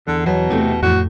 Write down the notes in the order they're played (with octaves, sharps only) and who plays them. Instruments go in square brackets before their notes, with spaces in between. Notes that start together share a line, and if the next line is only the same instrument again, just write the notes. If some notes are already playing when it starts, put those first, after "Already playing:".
[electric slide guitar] E2 [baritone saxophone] D3
[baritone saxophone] B2 [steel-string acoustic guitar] F#3
[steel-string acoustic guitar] C3 A3 C4 [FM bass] E3
[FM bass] F2 [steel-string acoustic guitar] A2 [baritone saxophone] F#4